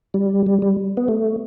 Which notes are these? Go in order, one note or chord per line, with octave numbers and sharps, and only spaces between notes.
G3
G3
G3
B3
A3